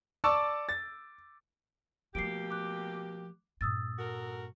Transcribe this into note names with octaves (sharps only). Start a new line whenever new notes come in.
D5 A5 C#6 D6 E6
A6
B2 F3 A3 A#3 G4 C7 D7
D6 F#6
G2 A#2 D#6 E6 A6
F#4 A4 A#4